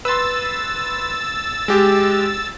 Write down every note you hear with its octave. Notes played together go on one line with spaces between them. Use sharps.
B4 C6 E6 A6
G#3 G4